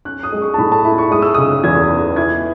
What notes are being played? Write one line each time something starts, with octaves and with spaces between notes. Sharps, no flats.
C#4 F#6
D#6
G#3
C#6
A5
A2 B5
A5
E4 B5
C#6
G#3 D#6
E6
C#3 D#6
E2 G#6
B3
E4 G#6